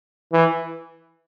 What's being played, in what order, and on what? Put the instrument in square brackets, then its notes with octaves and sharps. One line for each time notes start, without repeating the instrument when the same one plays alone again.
[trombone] E3